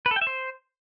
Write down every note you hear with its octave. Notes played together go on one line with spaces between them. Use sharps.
B4
A4
G5
E5
C5